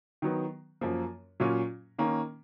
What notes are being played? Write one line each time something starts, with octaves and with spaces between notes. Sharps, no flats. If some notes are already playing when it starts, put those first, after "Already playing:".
D#3 F#3 B3
F#2 F3 A#3
A#2 F#3 C#4 F4
D#3 A#3 C#4